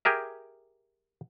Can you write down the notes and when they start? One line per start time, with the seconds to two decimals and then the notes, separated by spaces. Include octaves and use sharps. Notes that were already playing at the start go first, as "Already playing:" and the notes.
0.05 G4 G#4 A#4 E5